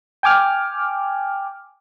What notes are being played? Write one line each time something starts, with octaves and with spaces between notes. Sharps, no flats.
G5 G#5 D6 F6